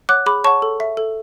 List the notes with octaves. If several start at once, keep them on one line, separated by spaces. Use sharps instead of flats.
C#5 F#5 D6 F#6
G#4 B5 D6
C#5 F#5 A5 C#6
A4
E5
A4